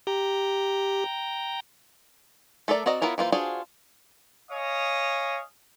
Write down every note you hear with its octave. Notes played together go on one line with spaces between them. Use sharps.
G4 G5 A#5
A3 A4 A#4 D5
C4 F#4 D5 D#5 A#5
B3 E4 F4 A#4 C#5
E3 A#3 F4 C5
D4 F4 F#4 G#4 C5
C#5 D#5 F5 G#5 D#6